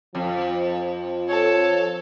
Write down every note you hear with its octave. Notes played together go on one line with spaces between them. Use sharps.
F2 F3
A4 C#5